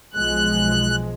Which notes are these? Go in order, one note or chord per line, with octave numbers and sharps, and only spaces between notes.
B1 F3 G#3 F#6